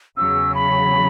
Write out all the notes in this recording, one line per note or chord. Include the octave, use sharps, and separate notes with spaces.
E2 C#3 F#3 E6
B5